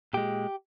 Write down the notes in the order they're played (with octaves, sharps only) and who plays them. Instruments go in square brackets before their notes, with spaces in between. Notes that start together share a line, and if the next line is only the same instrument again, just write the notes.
[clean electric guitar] A#2 G#3 G4